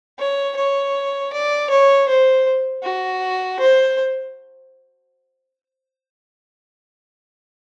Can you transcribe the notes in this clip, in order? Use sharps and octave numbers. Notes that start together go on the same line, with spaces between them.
C#5
C#5
D5
C#5
C5
F#4
C5